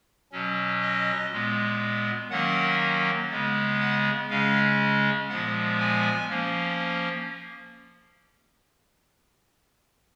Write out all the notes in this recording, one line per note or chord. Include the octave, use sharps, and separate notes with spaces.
B2 F#3 C#4
D#5
A#2 G#3 B3
D#3 F#3 A#3 C#4 F#5
C#3 G#3 B3
F#5
C#3 G#3 C#4 F5
A#2 F3 G#3 B3 F#5
G#5
F3 A#3 C#4